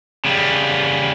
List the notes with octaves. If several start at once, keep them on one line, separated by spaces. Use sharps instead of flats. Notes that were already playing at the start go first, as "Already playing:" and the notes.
C#3 G3